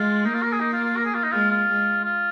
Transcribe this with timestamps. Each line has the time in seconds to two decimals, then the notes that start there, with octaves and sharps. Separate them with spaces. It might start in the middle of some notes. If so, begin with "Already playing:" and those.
Already playing: G#3 F4
0.25 A#3 D#4
0.34 F4
0.42 A#4
0.52 G#4
0.60 D#4
0.73 F4
0.84 F4
0.97 A#4
1.05 G#4
1.15 F4
1.24 D#4
1.32 G#3 F4
1.51 F4
1.69 G#3
2.04 F4